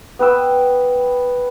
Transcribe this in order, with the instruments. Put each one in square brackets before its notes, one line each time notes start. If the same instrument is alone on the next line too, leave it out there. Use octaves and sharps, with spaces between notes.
[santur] B3 B4 G5 E6